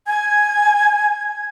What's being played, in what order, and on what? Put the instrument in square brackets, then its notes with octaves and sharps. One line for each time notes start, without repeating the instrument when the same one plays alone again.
[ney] G#5 [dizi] G#6